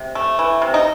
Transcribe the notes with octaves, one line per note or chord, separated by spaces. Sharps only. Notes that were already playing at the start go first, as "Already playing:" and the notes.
Already playing: C3
A3
E3
C3
D#4